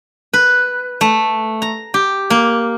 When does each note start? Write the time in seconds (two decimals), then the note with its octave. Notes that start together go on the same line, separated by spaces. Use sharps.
0.33 B4
1.01 A3
1.62 A#5
1.94 G4
2.30 A#3